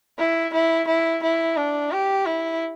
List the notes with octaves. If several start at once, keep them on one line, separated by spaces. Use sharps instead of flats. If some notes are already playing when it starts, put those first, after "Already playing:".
E4
E4
E4
E4
D4
G4
E4